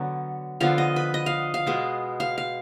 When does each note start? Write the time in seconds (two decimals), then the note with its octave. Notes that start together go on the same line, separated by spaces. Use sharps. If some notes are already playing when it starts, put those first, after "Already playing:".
Already playing: D3 F#3 B3
0.61 D3 F3 B3 F5
0.78 D#5
0.96 B4
1.14 D#5
1.26 F5
1.54 F5
1.67 B2 G#3 B3
2.20 F5
2.38 F5